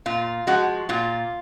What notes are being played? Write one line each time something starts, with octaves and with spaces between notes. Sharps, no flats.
A#2 F4
F3 G#3 F#4
A#2 F4